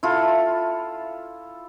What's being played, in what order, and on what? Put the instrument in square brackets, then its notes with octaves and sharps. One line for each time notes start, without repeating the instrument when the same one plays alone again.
[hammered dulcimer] E4 F4 A4